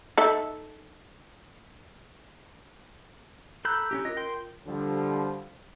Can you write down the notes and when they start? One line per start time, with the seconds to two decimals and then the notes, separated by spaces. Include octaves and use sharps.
0.17 D#4 A4 E5
3.65 A4 A#5 B5 E6 F#6 G6
3.91 C#4 D#4 G4
4.05 F4 A#4 D#5
4.17 G5 C6
4.67 D3 F3 G3